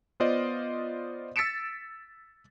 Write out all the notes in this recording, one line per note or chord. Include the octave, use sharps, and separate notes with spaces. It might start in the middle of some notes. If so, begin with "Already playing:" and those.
B3 F4 C5 D5 D#5
E6 A6 B6 C#7 D7 E7